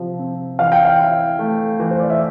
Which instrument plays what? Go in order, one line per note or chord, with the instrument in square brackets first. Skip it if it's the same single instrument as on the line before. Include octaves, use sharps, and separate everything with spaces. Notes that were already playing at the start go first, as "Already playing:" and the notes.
Already playing: [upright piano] C3 F3 C4
C4
[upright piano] E3 [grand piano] F5
[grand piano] G5
F5
[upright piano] E4
A3
E3
[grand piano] C5
D5
E5